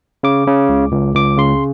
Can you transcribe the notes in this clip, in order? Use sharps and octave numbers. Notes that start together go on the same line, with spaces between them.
C#3 D6
C#3
C#2
C#2
C#2 D6
C#3 C6